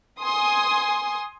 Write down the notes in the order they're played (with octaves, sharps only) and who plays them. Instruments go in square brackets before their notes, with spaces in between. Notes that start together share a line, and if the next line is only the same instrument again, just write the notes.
[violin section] G#5 C6 D#6